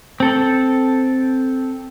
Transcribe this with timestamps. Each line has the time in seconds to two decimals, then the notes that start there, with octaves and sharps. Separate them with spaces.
0.20 C4 A4